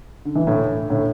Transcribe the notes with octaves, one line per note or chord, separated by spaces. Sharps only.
D3
E3
A2 D3
A2 D3